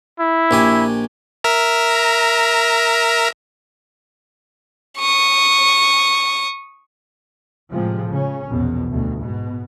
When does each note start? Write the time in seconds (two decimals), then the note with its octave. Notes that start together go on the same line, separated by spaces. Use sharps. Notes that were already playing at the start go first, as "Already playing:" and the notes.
0.20 E4
0.51 A#1 G4 G#5
1.44 A#4 E5 A#5
4.98 C#6 D#6
7.70 A2 C3 F3 G#3
8.08 C#3 C#4
8.47 A#1 E2 B2
8.90 D2 B2
9.19 G#2 B2